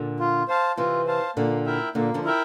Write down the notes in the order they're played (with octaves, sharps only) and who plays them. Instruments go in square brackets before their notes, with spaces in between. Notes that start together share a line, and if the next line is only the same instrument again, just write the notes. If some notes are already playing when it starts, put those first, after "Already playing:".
Already playing: [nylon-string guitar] A#2 D3
[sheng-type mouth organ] F4
C5 F5 A5
[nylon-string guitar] C3 E3 [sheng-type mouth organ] F4
[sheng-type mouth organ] C5 F5 A5
[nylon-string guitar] A#2 D3 [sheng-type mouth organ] A#3
[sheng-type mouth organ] E4 A#4 E5 G5
[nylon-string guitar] A#2 D3 [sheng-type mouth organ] A#3
[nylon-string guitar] D3 F3
[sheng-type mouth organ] E4 A#4 E5 G5